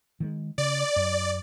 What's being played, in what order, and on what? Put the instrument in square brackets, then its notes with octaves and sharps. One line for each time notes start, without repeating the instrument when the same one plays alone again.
[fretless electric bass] D#3 F#3 G#3
[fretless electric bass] C#3 [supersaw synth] D5
[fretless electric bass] F#2